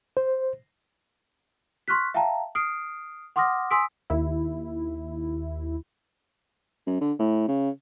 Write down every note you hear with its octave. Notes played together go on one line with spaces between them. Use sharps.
C5
C6 C#6 F6 F#6 B6
E5 F5 G5 A5 A#5
D#6 F6 C7 D7
F#5 C6 D6 D#6 F6 A#6
G#5 C6 D#6 E6 B6 D7
D#2 E4
F#2
D3
A2
C#3